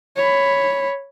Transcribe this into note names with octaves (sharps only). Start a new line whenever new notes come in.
C#5 B5